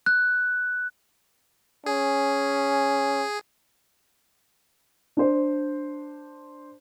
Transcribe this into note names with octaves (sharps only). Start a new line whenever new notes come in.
F#6
C#4 G#4
D4 C5